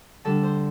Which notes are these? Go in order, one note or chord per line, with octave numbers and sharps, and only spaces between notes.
D3 G3 D4 A4 A5
C5 C6